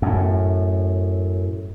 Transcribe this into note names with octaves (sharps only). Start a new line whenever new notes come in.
F#2 A2